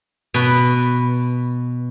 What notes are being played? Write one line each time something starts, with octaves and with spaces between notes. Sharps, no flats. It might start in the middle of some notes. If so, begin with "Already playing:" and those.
B2 B4